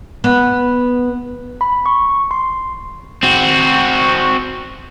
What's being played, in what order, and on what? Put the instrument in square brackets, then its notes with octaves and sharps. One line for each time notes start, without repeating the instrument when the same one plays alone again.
[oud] B3
[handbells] B5
C#6
C6
[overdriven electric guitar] C4 F#4